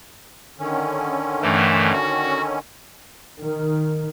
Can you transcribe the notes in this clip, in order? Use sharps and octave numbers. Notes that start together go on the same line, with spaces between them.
D3 D#3 C#4
G2 E3 A3
F#4
D#3